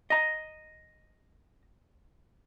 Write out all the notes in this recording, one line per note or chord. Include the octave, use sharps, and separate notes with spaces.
D#5 A#5